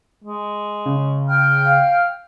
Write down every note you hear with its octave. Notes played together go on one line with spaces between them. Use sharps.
G#3
C#3
G5 F6
F5